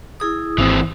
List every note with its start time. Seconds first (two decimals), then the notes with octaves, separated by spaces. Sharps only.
0.20 E4 G#4 D#6
0.58 G#1 E3 C4